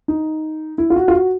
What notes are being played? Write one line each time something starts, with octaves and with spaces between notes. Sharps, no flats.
D#4
E4
F4
F#4
F4
F#4